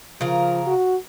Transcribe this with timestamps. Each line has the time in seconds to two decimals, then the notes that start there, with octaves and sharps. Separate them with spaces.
0.21 C#3 F3 A#4
0.67 F#4